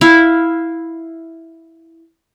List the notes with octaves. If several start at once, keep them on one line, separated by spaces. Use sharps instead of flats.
E4 E5 F5